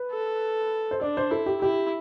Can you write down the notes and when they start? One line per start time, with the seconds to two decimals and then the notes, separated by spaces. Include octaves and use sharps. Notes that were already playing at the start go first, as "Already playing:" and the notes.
Already playing: B4
0.12 A4
0.91 C5
1.01 D4 D5
1.17 C5
1.31 E4 A4
1.46 G4
1.61 E4 G4